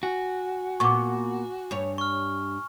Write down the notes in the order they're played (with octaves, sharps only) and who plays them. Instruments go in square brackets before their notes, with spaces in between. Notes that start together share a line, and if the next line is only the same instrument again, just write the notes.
[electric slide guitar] F#4 [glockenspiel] G#5
[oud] A#2 B3 [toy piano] C#6 D6
[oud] G2 C#5
[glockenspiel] C#6 F6